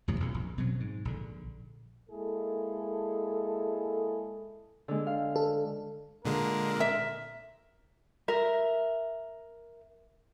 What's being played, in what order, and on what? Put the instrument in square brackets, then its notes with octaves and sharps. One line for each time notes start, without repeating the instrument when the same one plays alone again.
[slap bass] E2 A2 C3 F#3
B1 F2 A#2 C#3
A#1
B2 F#3 C4
G#2
A#1 D3
[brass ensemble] G#3 A#3 E4 G#4 A4
[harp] D3 G#3
F5
[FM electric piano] A4
[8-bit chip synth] A#2 D3 G#3 [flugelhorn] A#4
[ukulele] E5
A#4 E5